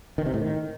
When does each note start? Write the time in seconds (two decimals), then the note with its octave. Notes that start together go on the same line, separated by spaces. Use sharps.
0.18 D#3
0.26 C3
0.34 A2
0.41 D#3